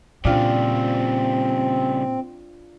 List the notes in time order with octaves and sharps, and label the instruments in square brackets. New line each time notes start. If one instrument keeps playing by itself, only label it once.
[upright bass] A#2 [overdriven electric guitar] C#3 G3 [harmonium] C4 [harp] D4 F4